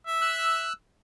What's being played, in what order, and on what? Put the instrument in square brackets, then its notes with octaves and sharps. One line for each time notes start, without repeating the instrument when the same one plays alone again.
[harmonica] E5
[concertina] E6 F#6